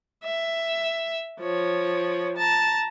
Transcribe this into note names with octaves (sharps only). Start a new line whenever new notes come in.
E5
F3 C#5
A5 A#5